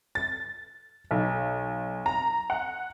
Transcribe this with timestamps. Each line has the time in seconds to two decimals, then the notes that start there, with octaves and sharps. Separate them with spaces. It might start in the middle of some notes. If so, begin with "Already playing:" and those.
0.15 A6
1.11 B1
2.06 A#5
2.50 F#5